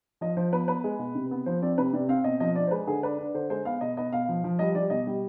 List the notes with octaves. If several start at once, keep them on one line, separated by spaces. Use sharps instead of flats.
F3 D#5
F3 C5
B3 B4
B3 B4
G#3
B2
C3
B3
F3 C5
C4 D5
C3 B4
C3 D5
C4 F5
B2 D#5
F3 D#5
D4 D5
C5
G#3 B4
D3 G#4
D4 B4
D4
D3 C5
G#3 C5
B3 F5
B2 D#5
B3 D#5
B2 F5
F3
F3
G3 D#5
G3 D5
B2 D#5
G3